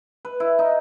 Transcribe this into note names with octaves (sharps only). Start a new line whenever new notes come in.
B4
E4
D#4